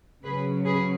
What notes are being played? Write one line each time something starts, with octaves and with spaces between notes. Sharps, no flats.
C#3 F#3 C#4 G#4 B4
G#4 B4